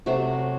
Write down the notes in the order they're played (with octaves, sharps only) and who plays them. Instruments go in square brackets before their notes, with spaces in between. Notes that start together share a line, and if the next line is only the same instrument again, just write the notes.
[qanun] C3 F#3 A3 F#4